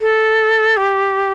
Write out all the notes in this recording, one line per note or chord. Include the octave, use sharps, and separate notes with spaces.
A4
G4